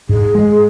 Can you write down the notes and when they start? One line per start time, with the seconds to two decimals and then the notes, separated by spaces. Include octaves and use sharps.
0.09 G#2 G#4
0.35 G#3